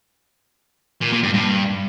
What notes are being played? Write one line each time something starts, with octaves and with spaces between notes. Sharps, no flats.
A#2
A#2
G2
G2